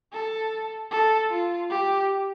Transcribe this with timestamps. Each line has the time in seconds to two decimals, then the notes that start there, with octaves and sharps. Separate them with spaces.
0.13 A4
0.91 A4
1.31 F4
1.70 G4